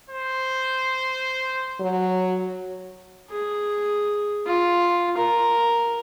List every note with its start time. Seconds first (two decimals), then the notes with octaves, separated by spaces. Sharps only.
0.10 C5
1.80 F#3
3.30 G#4
4.46 F4
5.17 A#4